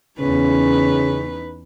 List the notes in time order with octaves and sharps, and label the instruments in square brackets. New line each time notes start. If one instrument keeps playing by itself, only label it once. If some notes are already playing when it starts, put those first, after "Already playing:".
[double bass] E2 C#4 [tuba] C#3 [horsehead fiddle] D#4 B4